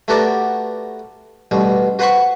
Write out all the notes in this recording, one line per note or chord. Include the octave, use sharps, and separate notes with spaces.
A3 B3 F#4 G4 A#4 D5
A1 B2 G3
F#4 B4 C5 F#5 B5 C#6